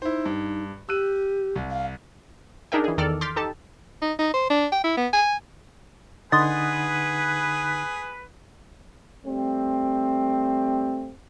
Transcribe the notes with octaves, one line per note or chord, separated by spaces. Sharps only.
D#4 E4 C5
G2
G4 E6 F#6 D#7
C2
F5
D4 D#4 G#4 A#4 E5 G5
E3 G#4
E2 D#3 A4 D5 F6
C6 D6 F6 G6 A6 B6
D#4 G4 A4 A5
D#4
D#4
C5
D4
G5
E4
B3
G#5
D3 D#4 G#4 B4 F#5 C6 D#6 A6
G3 A3 C4